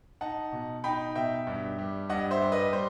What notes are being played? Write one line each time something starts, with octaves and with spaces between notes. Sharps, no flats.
D#4 F#5 A5
B2
D#4 G5 B5
B2 E5 G5
G2
G3
G2 D#5 F#5
C5 E5
G3
B4 D#5
G3 C5